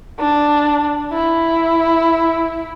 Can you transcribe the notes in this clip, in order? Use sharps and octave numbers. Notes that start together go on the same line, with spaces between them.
D4
E4